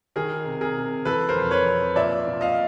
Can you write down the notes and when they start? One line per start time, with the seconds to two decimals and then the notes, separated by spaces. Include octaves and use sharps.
0.16 D#3 G#4 A#4
0.46 C3
0.61 G#4 A#4
0.77 C3
1.05 E3 A4 B4
1.29 A#4 C5
1.36 F2
1.51 B4 C#5
1.66 F2
1.96 A#2 D5 E5
2.27 A#2
2.41 D#5 F5